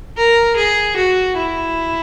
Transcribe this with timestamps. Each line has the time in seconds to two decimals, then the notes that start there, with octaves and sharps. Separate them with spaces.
0.17 A#4
0.56 G#4
0.96 F#4
1.36 E4